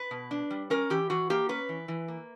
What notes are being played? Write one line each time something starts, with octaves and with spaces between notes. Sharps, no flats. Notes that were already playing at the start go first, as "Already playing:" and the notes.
Already playing: B4
B2
D4
G3
C#4 A#4
E3 G4
E3 F#4
A#3 G4
C#4 B4
E3
E3
A#3